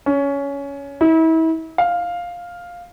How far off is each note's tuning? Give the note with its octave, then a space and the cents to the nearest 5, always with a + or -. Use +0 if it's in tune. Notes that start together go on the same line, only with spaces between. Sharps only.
C#4 +15
E4 -35
F5 +5